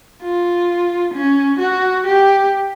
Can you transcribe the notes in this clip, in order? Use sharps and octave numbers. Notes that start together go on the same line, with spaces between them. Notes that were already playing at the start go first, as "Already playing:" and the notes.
F4
C#4
F#4
G4